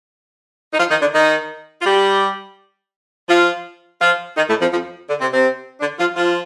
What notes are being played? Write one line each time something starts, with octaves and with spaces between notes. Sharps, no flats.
D#4
F3 F4
D#3 D#4
D3 D4
D#3 D#4
F4
G3 G4
F3 F4
F3 F4
D#3 D#4
A2 A3
F2 F3
F2 F3
D3
C3 C4
C3 C4
D3 D4
F3 F4
F3 F4